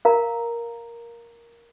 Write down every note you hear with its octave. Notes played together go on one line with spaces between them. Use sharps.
A#4 F5 A#5